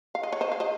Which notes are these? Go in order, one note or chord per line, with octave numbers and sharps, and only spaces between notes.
F5
D#5
C#5
C5 D#5
F5
C5 D#5